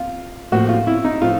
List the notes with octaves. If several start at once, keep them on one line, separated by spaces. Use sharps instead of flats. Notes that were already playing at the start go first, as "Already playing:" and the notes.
Already playing: F4
A2 F3 A#3 F#4
F4
E4
D#4
A2 F3 F4